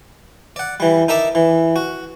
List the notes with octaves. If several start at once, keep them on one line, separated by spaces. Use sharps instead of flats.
D5 F#5
E3 G3
D#4 A#4 E5 A5 D6
E3
F#4